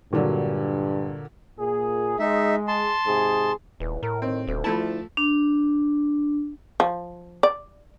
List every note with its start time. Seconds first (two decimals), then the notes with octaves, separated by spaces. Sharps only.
0.13 G2 A#2 D3 F#3
1.59 A#2 G#4
2.20 G#3 D#4 E5
2.68 A5 C6
3.06 G#2 C3 G#4
3.80 D#1 E2
4.03 A2 A#4
4.22 D#3 C4
4.47 D#1 D2
4.64 F3 A3 E4 A5
5.17 D4
6.80 F3
7.43 D5